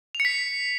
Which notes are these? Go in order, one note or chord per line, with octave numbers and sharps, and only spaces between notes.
F7
C#7
B6